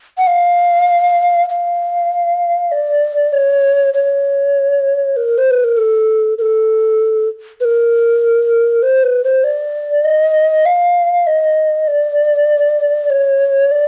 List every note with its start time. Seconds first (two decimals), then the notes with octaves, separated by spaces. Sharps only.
0.18 F#5
0.27 F5
1.49 F5
2.72 D5
3.33 C#5
3.94 C#5
5.16 A#4
5.38 C5
5.51 B4
5.64 A#4
5.77 A4
6.38 A#4
6.42 A4
7.61 B4
7.65 A#4
8.82 C5
9.03 B4
9.24 C5
9.44 D5
10.05 D#5
10.66 F5
11.27 D#5
11.88 D5
13.10 C#5
13.71 D5